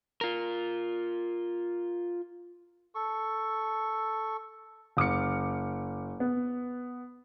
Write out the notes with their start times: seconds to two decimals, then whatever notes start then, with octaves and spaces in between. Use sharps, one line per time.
0.21 F4 A#4
2.95 A4 C#6
4.97 F#1 D6 F6 C#7
6.20 B3